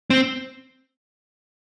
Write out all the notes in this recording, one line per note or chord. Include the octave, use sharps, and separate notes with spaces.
C4